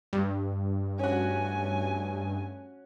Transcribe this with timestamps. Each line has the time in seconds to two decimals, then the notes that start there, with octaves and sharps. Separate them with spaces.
0.13 G2
0.99 A3 C#4 F#4 G#5